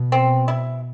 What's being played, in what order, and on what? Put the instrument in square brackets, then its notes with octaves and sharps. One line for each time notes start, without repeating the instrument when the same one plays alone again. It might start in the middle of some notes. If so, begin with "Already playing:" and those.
Already playing: [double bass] B2
[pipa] C4
E4